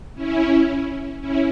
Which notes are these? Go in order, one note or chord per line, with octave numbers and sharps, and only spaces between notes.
C#4 E4
C#4 E4